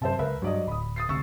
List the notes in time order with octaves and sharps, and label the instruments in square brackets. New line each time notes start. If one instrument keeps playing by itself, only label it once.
[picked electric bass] F#2 C3 [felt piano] C5 E5 A5
[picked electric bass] C#2 [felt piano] A#4 B4 E5
[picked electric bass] G2 [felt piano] F#3 D5 D#5
[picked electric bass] D1 [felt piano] B5 D#6
[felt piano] D#6 A6 C7
[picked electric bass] D2 C3 [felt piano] C#6 E6 A6